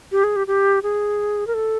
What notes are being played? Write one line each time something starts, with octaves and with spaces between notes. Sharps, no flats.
G4
G#4
G4
G4
G#4
A#4
A4